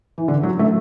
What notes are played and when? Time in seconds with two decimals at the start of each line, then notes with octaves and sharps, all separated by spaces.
0.18 E3
0.28 D3
0.43 F#3
0.59 A3